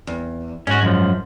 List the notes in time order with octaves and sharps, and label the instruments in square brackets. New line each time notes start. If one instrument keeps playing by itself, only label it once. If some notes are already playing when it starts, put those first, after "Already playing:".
[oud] E2
[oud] G#2 [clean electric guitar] C#4 F#4
[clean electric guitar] F#2 F3